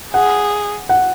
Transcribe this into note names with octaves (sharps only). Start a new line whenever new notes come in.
G#4 F#5
F#5